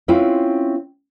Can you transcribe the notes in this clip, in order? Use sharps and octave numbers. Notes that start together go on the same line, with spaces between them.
C4 C#4 E4 F4 B4